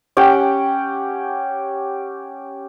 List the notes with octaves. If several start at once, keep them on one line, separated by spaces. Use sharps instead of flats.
C#4 G4 F#5 G5